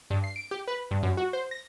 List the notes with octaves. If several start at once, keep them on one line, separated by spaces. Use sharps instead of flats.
G2
C7
D7
G4
B4
G2
F#2
F#4
C5
A#6